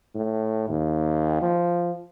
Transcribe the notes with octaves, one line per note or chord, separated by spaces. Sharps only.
A2
D#2
F3